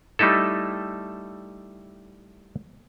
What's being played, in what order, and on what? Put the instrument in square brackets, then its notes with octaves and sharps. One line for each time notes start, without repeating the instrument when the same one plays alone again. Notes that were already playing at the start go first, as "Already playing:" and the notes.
[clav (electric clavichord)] G3 A3 D#4 E4 A4